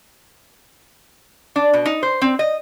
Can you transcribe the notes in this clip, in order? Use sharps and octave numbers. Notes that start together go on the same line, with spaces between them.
D4
B2
D#4
C5
C4
D#5